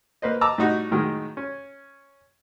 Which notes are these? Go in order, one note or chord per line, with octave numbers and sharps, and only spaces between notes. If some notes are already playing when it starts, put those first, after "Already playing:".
A#3 B4 C5 D#5
D#5 A5 A#5 D6 E6
A2 G3 D#4 F#4
A2 D#3 F#3 G#3
C#4